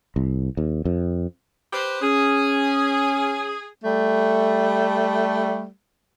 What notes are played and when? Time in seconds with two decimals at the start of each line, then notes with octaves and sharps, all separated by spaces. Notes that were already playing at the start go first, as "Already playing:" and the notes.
0.16 C2
0.57 D#2
0.85 F2
1.73 G4 B4 C5
2.02 C#4 G#4
3.84 G3 A3